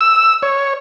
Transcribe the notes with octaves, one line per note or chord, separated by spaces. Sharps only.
E6
C#5